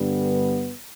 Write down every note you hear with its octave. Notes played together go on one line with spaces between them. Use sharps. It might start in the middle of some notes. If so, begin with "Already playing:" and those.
Already playing: G2 D3 G3 B3